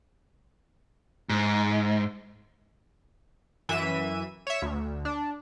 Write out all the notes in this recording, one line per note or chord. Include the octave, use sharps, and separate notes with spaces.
G#2
F#2 E3 E5 D#7
C#5 E5
D2
D4